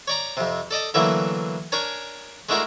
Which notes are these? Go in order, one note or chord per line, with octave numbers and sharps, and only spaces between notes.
C#5 D5 A#5
F2 C3
A4 D5 D#5 A5
D3 E3 F#3 A3 A#3 E4
D4 A#4 C#5 G#5
G#3 A3 D4 E4 F#4 A#4